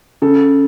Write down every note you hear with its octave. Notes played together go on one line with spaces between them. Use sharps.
C#3 A4